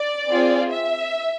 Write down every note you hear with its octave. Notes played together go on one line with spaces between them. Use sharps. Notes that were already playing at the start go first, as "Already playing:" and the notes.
Already playing: D5
C4 F4 G#4
E5